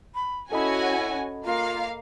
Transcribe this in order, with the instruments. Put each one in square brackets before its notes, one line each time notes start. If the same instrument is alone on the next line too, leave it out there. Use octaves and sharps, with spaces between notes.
[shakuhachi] B5
[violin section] C#4 F#4 G#5 [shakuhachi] E4 [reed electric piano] A4 D#5 B5
[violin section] A#3 F5 [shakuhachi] F4